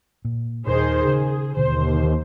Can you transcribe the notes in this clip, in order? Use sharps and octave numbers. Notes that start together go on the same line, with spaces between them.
A#2
D#2 A#2 D#3 G#4 C5
C#3 G#4
D#2 B2 D3 C5